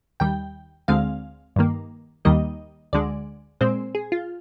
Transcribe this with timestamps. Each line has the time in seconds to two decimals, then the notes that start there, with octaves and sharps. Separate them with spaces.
0.20 D#2 D#3 G3 G5
0.88 D2 D3 G#3 C4 F5
1.56 G2 D#3 A#3
2.25 D#2 D#3 G3 A#3 D#5
2.93 D2 D3 G#3 D5
3.61 A#2 G#3 C4 C5
3.95 G#4
4.12 F4